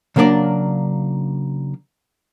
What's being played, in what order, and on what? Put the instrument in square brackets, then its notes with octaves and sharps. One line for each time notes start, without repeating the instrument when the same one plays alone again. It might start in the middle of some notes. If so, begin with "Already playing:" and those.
[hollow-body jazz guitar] C#3 F#3 A#3 D4 D5